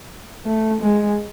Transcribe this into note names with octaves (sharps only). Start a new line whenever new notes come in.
A3
G#3